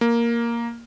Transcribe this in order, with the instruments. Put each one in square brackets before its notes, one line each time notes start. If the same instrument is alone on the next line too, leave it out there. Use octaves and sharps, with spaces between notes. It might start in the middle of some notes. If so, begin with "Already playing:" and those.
[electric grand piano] A#3